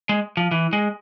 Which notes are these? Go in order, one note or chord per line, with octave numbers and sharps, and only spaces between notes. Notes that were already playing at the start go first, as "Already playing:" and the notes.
G#3
F3
E3
G#3